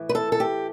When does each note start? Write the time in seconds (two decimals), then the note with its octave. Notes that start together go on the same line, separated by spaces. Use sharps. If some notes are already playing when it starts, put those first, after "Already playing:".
Already playing: A2 E3
0.09 B4
0.15 A4
0.32 A4
0.40 G4